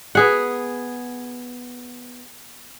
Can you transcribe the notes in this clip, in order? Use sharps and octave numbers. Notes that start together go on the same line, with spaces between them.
B3 G#4 F#5